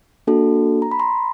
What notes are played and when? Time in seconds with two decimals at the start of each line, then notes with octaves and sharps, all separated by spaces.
0.27 A#3 D4 F#4 A4
0.82 A#5
0.91 B5
1.00 A#5 C6